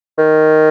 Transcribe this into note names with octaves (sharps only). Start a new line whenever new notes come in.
D#3